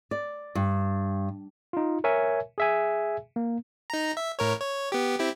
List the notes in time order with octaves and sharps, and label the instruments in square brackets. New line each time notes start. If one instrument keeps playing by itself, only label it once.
[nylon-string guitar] D5
G2
[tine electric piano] D#4 F4
A#4 C#5 E5 G#5
G#4 E5 G#5
A#3
[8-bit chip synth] D#4 A#5
E5
A2 A#4 C#5
C#5
B3 G4
C4 E4 G4